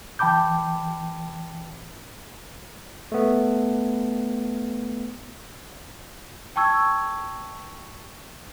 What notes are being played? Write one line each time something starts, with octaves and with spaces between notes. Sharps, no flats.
E3 G5 A5 B5 D6 G6
A3 B3
G5 A5 C#6 E6 G#6